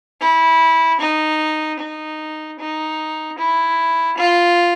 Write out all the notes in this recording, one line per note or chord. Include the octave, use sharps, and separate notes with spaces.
E4
D#4
D#4
D#4
E4
F4